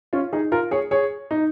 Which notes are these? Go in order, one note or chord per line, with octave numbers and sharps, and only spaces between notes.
C#4 F4
D#4 G#4
F4 A#4
G#4 C#5
G#4 C#5
D#4